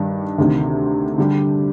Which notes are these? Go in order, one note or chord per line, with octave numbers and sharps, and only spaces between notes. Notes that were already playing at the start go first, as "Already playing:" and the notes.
Already playing: G2 D#3 G3 D4
D2 C3 D#3
D3 G3 D4 G4